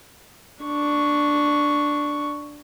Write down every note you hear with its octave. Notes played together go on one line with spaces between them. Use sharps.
D4 C#6